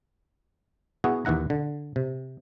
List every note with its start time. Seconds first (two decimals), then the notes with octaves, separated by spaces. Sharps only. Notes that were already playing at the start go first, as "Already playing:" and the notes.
1.04 B3 E4 F#4 G#4
1.25 D#2 E3 E4 F#5 A#5
1.50 D3
1.96 C3